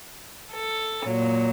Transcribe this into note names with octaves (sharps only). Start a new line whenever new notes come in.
A4
A#2 F#3